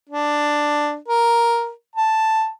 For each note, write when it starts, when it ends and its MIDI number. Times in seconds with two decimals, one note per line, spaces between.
0.10 0.96 62
1.08 1.70 70
1.96 2.48 81